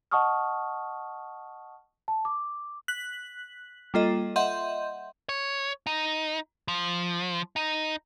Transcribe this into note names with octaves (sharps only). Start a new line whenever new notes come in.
D#5 F#5 A5 C#6 D#6 F6
A5
D6
F#6 B6 F#7
G3 A#3 F4 A4 D#5
D#5 E5 F#5 C6 G6
C#5
D#4
F3
D#4